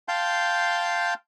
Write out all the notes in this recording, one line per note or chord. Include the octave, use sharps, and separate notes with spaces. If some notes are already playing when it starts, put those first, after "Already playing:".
F5 G5 A5 C6 G6